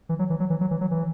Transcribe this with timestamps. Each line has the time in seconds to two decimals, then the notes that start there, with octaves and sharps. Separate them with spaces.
0.09 E3
0.19 F#3
0.30 E3
0.40 F#3
0.50 E3
0.61 F#3
0.71 E3
0.81 F#3
0.91 E3